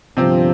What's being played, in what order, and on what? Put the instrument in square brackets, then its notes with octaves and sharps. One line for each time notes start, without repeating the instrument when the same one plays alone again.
[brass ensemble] G1 G2 F3 [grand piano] C3 C4